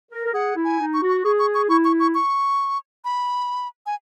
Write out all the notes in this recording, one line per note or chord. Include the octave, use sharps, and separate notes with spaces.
A#4
A#4
G#4 F#5
E4
G#5
D#4
C#6
F#4
C#6
G#4 C#6
C#6
C#6
E4 C#6
C#6
C#6
C#6
B5
G#5